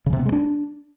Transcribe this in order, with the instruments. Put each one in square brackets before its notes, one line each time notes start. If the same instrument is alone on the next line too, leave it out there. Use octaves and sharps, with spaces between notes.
[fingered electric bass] C#3
C3
B3
G#3
D4